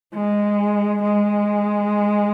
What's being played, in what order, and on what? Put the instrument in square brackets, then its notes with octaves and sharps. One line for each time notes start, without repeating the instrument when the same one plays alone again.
[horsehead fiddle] G#3
G#3